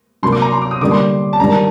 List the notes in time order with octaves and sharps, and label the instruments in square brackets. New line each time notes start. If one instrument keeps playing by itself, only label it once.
[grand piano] C3 F#3 A#3 D4 [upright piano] C6
[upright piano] D6
A#5
C6
D6
D#6
[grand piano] D3 G3 A#3 D4 [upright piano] D6
[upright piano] C6
A5
[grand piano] D#3 G3 D4 [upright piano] A#5
[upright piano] A5